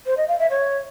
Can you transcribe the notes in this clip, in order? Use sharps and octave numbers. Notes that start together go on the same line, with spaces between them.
C5
D#5
F5
E5
C#5